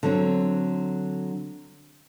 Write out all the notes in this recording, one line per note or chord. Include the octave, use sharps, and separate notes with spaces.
D3 F#3 C4